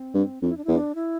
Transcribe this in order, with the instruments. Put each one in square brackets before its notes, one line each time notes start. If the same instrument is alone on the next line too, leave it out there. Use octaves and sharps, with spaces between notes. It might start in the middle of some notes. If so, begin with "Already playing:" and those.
Already playing: [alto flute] C4
[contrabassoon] G2
[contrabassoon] F2 [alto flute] D4
[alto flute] E4
D4
E4
[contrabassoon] E2
[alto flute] D4
E4